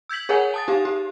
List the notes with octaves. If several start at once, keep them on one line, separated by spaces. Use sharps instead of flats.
E6 G6 G#6 B6 F#7
G#4 A#4 C#5 F#5 G#5
A5 D#6 A6
D#4 G4 F5
G4